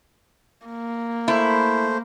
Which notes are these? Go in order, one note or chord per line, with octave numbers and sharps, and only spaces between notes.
A#3
A3 E4 C5